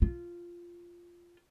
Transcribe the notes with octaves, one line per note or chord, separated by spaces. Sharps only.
F4